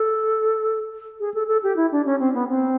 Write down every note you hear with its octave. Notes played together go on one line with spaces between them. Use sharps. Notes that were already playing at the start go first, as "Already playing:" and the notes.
Already playing: A4
G#4
A4
A4
G4
E4
D4
C#4
C4
B3
C4